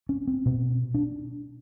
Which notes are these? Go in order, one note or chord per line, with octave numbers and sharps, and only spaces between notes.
C#4
C4
B2 C4
D4